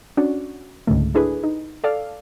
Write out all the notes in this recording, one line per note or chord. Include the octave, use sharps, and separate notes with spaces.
C#4 D4 F#4 D5
C#2 G#2 D3 A3
D4 E4 G#4 A4 B4
D#4
A4 D5 F5